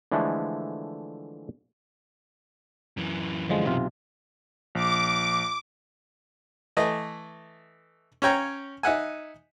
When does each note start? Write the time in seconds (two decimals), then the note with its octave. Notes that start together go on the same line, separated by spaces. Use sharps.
0.12 D3 E3 F3 G#3 A3
2.97 F#2 E3
3.50 D3 F3 G#3
3.66 B1 C3 F4
4.75 A#1 D6
6.77 E3 A3 D#5
8.22 C#4 C#5 G5 A#5
8.83 D#4 E5 F#5 G#5